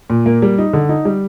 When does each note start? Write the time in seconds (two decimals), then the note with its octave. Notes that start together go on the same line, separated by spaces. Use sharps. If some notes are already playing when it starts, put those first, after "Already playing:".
0.10 A#2
0.26 A#3
0.42 G3
0.58 D#4
0.73 D3
0.89 D#4
1.05 G3